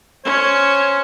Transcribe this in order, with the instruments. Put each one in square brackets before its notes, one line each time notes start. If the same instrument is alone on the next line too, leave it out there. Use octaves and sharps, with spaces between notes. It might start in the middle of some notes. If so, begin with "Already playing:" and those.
[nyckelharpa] C#4 C5 [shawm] C#5